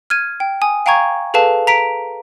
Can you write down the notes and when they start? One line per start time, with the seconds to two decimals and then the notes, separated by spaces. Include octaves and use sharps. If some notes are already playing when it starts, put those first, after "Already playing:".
0.10 F6 G#6 D#7
0.40 G5
0.62 G#5 D#6
0.86 F5 G5 G#5 A#5 C#6 G#6
1.34 G#4 A4 B4 F5 A5
1.67 A#5 B6 D7